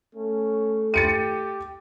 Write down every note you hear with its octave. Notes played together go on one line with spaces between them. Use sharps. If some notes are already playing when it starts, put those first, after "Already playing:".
A3 C#4
G4 A6 C#7 D#7